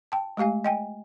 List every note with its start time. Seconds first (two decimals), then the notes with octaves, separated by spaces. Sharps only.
0.12 G5 A5
0.37 G#3 A3 G4 F5 G#5
0.64 D#5 G5 G#5